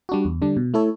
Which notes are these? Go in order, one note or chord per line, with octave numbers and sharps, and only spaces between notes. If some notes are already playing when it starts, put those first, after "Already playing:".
G3 D4 F#4
E2
D3 G3 D4
B2
A3 E4 A4 C#5